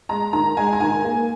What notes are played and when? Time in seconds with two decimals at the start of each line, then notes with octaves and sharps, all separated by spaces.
0.09 G#3 A#5
0.33 D#3 A#5
0.57 G#3 G#5
0.73 A#5
0.80 D#3 G#5
1.04 A#3